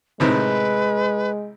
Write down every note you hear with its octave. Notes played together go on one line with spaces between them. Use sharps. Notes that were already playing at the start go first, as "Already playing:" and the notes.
A2 C3 D#3 G#3 B4